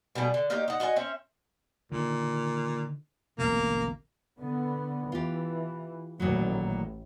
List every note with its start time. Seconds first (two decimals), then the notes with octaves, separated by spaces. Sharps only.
0.15 B2 G3 A3 G#4
0.34 D3
0.50 A#3 D#4 G4 C#5
0.68 D#4 F#5
0.80 F#4 D#5 E5 G#5
0.96 C4 C#4 C#5 E5
1.92 A#2 D3 D#3
3.38 D1 A1 B2 A#3
4.37 D3 B3
5.12 E3 F4 G4
6.20 A1 A#2 D#3 F#3